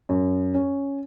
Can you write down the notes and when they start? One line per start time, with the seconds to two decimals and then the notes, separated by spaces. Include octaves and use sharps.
0.09 F#2
0.54 C#4